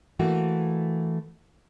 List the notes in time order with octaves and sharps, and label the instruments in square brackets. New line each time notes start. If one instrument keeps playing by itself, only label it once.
[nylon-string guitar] E3 A3 A#3 F#4